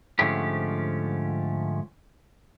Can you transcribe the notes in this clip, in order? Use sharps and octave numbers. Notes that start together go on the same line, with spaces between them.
G#2 D3 F3 A3 C#4 G4